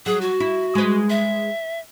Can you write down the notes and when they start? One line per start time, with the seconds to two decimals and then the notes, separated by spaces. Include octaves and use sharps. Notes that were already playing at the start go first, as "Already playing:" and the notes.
0.06 F#3 G#4
0.21 F#4
0.40 E4
0.75 G#3 B4
1.10 E5